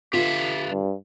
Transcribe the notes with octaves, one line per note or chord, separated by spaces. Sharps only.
D3 B3 F4 G4 E5 F5
G2